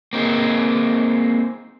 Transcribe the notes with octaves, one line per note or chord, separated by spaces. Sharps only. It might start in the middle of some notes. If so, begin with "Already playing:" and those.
A#3 C4 D#4 F#4 G#4